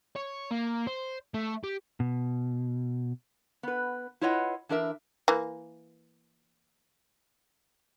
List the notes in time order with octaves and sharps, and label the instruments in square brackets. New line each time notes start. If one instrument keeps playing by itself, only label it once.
[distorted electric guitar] C#5
A#3
C5
A3
G4
[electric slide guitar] B2
[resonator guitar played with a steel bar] B3 B4
E4 F4 B4 C#5 D#5 F#5
E3 D4 A#4 E5
[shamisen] E3 A#3